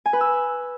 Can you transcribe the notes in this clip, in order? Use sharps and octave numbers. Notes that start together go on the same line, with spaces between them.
G#5
B4
E6